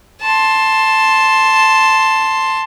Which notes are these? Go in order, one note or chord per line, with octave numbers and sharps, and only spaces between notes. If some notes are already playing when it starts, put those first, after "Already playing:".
A5 C6